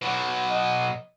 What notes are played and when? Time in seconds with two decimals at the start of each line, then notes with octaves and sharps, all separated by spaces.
0.02 B2 F#3
0.50 D#5